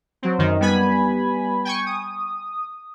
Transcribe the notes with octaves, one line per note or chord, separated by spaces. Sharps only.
F#3 C4
F#2 D#3
G3 B3 G#5 B5
G5 G#5 C#6
D#6